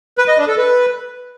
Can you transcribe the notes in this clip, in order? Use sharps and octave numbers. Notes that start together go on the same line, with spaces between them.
B4
D#5
D4
A4
B4